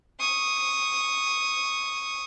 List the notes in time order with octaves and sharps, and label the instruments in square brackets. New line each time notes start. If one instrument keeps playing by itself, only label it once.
[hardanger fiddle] C#6 D#6